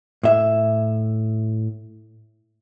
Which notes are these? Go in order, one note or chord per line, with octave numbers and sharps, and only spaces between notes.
A2 E5